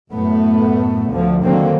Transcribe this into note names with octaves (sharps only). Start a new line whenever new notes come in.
F#2 A2 A3 B3
D2 D3 F3
D3 D#3 F#3 A#3 C4